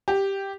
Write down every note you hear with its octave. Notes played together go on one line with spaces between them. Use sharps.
G4